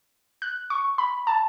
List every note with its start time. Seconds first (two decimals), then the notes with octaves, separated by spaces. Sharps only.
0.42 F#6
0.70 C#6
0.98 B5
1.27 A5